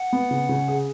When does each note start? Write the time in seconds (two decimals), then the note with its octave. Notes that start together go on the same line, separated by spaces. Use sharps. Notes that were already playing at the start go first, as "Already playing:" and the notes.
Already playing: F#5
0.13 B3
0.31 C#3
0.49 C#3
0.68 G#4